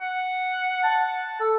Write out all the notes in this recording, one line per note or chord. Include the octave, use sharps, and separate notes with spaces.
F#5
A5
A4